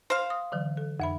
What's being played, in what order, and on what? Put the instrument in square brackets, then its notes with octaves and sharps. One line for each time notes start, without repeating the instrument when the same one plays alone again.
[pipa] C5 F5
[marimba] D#6
D3 E3 F#3
A4
F2 E5 B5